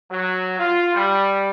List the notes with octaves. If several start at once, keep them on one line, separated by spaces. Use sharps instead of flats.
F#3
F4
G3